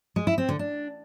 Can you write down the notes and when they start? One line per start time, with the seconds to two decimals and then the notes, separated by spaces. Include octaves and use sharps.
0.16 G#3
0.27 E4
0.38 C4
0.49 D3
0.59 D4